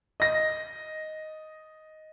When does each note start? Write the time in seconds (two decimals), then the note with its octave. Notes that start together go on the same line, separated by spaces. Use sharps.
0.20 D#5 A#6